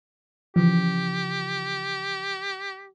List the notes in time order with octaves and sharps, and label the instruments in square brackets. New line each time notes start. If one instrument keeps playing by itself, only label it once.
[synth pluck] C#3 E3 F3 [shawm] G4